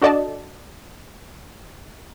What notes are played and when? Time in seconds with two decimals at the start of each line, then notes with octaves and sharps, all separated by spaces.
0.02 D4 F#4 A4 D5 D#5 A5